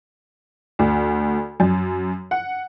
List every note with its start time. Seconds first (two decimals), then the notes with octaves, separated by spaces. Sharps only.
0.79 D2
1.60 F#2
2.31 F#5